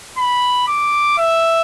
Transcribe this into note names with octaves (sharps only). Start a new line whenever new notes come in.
B5
D6
E5